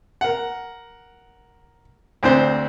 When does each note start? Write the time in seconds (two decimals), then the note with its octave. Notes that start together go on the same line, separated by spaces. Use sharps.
0.21 A#4 F#5
2.23 D2 C4 D4 C5